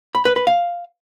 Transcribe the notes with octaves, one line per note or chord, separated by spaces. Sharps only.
B5
B4
B4
F5